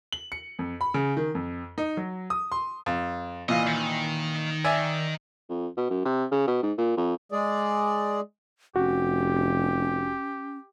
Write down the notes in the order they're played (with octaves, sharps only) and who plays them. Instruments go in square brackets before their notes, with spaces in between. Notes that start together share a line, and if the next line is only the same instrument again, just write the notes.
[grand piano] F#7
C#7
F2
B5
C#3
D#3
F2
D#4
F#3
D#6
C6
[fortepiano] F2
[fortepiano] A#2 E3 F5 [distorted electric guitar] D#5
[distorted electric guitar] D#3
[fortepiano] D5 E5 G#5
[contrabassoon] F2
B2
F#2
C3
C#3
B2
G#2
A#2
F2
[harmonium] G#3 G#4 D5
[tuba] F1 [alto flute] C#4 [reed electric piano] F#4 [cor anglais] G4